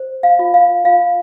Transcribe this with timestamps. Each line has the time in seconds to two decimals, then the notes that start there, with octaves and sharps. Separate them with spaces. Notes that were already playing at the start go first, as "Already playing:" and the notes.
Already playing: C5
0.23 F5
0.39 F4
0.54 F5
0.85 F4 F5